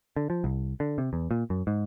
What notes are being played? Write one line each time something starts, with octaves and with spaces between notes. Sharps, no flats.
D3
F3
C2
D3
C3
E2
A#2
F#2
G#2